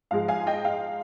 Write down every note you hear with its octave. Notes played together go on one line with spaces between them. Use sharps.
G#2 F3 G#3 F5
F5 G#5
D#5 G5
F5